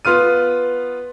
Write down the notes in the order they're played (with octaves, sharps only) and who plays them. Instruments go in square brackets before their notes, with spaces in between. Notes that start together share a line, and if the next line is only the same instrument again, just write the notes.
[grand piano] B3 F4 F6 D#7